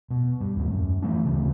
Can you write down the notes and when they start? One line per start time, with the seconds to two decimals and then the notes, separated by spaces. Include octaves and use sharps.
0.10 B2
0.40 G2
0.56 D#2 A2
0.71 F#2
1.02 E3 A3 D4
1.25 F1 D2 C#3